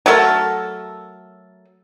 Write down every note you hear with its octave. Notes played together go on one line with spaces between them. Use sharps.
F#3 A3 A4 A#4